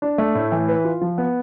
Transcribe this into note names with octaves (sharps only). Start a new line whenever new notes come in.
D4
A3
A2
E3
B4
F4
F3
B3